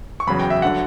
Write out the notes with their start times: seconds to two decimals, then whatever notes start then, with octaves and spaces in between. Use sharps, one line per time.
0.20 C#6
0.27 E2 C#3 F#3 B5
0.39 G5
0.50 E5
0.62 D3 F#3 F#5